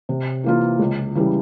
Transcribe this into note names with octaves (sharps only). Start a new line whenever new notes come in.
C3
E3 A#3 F4
C#2
C#3 E3 G3